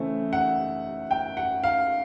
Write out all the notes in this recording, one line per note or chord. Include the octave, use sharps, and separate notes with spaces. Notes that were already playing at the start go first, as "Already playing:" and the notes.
Already playing: C#3 E3 A3 C4
F#5
G5
F#5
F5